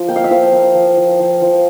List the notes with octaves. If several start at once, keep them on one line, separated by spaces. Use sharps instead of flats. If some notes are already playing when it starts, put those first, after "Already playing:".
Already playing: F3 F4
A#3 G5
F5
E5
F3 F5
A#3
F3
F3
F3
F3